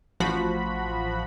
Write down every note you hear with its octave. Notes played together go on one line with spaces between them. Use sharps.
A1 F3 F#4 B5